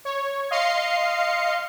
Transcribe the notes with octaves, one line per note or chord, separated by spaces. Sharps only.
C#5
D#5 F5 C6 C7 C#7